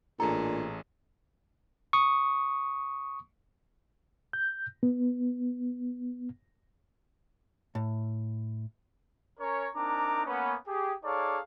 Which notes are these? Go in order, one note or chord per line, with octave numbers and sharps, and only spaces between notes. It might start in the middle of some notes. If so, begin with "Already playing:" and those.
A1 A#2 D4 G#4 A4 A#5
C#6 D#6
G6
B3
A2
C#4 A#4 C#5
C4 D4 D#4 A#4 A#5 D6
A#3 B3 C#4
G4 G#4
D#4 G#4 A4 C#5 D5 F5